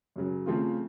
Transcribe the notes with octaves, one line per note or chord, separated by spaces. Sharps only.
F#2 C#3 F#3
C#3 F3 A3 C4 F4